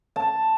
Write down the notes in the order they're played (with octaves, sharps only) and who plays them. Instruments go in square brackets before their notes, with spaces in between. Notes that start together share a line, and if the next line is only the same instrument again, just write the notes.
[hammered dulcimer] A5